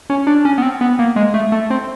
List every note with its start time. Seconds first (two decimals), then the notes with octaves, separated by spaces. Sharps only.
0.10 C#4
0.27 D4
0.45 C#4
0.58 B3
0.62 C4
0.81 B3
0.99 A#3
1.16 G#3
1.34 A3
1.52 A3
1.70 C4